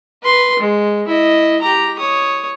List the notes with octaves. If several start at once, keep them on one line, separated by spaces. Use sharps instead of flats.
B4 C6
G#3
E4 D#5
G4 A#5
C#5 D#6